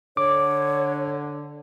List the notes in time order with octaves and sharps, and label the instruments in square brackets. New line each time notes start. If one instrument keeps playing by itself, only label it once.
[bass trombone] D3 [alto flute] C#5 [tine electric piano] D6